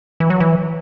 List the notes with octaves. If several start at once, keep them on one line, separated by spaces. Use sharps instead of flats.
E3
F#3
E3